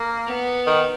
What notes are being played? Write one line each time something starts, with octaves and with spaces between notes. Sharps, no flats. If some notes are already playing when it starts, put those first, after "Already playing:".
Already playing: A#3
B3
D#3